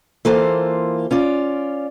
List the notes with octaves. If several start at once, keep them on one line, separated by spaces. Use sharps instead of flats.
E3 A#3 F4 A4 C5
C#4 F4 D5